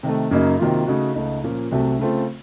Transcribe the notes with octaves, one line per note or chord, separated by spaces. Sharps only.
C3 D#3 A3
F#2 C#3 F#3 A#3 D#4
C3 D#3 F#3 A#3 F4
C#3 A3 D#4 F#4
C#2 C#3 A3 D#4
A#2 F3 A#3 C#4
C2 C3 F#3 A3
C#3 A3 C4 F4